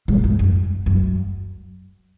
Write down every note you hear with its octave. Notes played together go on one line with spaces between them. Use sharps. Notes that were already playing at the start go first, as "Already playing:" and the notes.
G#2
G#2
F#2
F#2